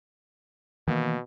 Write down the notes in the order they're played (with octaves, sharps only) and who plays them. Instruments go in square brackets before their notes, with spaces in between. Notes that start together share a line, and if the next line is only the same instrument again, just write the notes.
[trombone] B2 [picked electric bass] D#3 E3 A#3